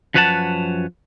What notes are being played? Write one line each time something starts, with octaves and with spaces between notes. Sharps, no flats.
F#2 F3 B4 C#5 F#5 A5